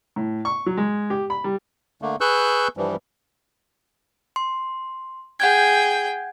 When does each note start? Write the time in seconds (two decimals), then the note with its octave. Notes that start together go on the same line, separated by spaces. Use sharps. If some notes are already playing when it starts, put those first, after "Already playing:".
0.16 A2
0.45 C#6
0.66 F#3
0.77 G#3
1.10 G4
1.30 B5
1.44 G3
2.02 D3 A3 A#3
2.21 G#4 B4 C#6 E6 F#6 G6
2.77 G2 E3 F3 G3
4.36 C6
5.40 G#4 F#5 G5 G6 G#6